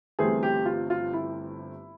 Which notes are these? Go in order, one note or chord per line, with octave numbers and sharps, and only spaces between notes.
G1 G2 E3 A3 C4 G#4
G4
F4
F4
E4